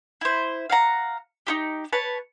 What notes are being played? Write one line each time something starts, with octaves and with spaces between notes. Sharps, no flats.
E4 C5
F5 F#5 A#5
D#4 E4 G4
B4 C#5 A5